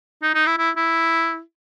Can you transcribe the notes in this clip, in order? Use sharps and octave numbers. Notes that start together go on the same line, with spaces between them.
D#4
D#4
E4
E4
E4